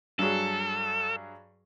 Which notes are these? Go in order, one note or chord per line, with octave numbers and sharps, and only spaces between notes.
G2 F#3 G#4 A4